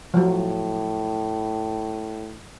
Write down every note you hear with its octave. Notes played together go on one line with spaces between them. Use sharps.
A2 F3 F#3